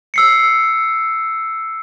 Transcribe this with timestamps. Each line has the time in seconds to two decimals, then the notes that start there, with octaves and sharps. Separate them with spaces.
0.14 E6 C7 C#7